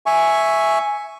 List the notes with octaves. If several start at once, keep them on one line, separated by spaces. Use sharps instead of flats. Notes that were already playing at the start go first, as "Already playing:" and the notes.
E5 G#5 C#6